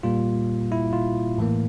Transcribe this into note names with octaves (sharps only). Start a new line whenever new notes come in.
A#2 G3 A#3 F4
E4
F4
A2 E3 A#3